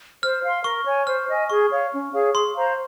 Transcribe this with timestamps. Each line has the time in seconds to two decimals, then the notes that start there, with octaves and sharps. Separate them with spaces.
0.23 C5 F6
0.44 F5 C6
0.64 A#4 C#6
0.86 C#5 G#5
1.07 C5 F6
1.29 D#5 G#5
1.49 G#4 C#6
1.70 C#5 F5
1.92 C#4
2.14 G#4 C#5 F5
2.34 G#4 C6
2.56 C5 F5 A#5